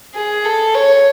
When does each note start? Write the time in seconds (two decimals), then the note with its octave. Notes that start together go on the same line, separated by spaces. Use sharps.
0.15 G#4
0.45 A4
0.75 C#5